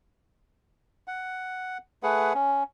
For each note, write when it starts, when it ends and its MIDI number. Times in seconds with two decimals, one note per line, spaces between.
1.07 1.78 78
2.03 2.33 57
2.03 2.33 68
2.03 2.33 71
2.03 2.33 78
2.35 2.63 61